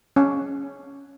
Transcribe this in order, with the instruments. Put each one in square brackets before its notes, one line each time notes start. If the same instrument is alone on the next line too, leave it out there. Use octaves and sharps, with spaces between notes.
[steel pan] C#4